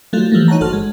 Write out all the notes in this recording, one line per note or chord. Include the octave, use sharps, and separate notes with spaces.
F#3 G3 A3 E4 F4
E3 F3 G3 A3 A#3
D#4 C#5 F#5 A5 A#5
G1 F#4 A4 C5 F6
G#3